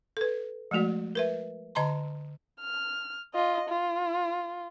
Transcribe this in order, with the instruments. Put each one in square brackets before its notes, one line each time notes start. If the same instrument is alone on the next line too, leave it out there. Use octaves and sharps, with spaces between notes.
[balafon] A4 B4
F3 G#3 A3 F#4 D5
A#4 B4 E5
D3 D#5 A5 A#5 C6
[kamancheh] F6
F4 D#5
F4